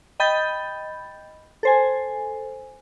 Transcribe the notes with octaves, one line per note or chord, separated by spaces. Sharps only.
D#5 G5 B5 G6 A6
A4 C5 G#5